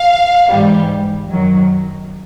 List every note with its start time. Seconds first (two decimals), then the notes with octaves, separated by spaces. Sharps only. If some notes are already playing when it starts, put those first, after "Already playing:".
Already playing: F5
0.50 G#2 E3 G3
1.30 F#2 D#3 F#3